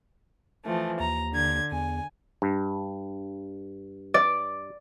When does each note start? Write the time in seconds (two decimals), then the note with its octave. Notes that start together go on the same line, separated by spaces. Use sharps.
0.65 E3 F3 A3
1.00 D#2 A#5
1.32 D3 G#6
1.72 E2 G#5
2.42 G2
4.14 D5